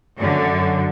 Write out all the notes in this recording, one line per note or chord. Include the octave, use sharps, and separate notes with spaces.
F#2 D3